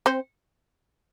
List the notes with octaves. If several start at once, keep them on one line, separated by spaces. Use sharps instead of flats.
C4 C5